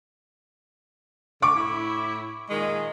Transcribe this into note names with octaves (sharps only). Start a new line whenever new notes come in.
D3 C#6 D6
A2 E4
A#2 D#3 G#3